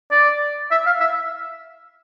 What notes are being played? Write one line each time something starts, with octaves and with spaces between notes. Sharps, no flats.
D5
E5
F5
E5